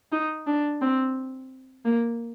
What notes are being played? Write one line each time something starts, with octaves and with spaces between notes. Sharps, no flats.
D#4
D4
C4
A#3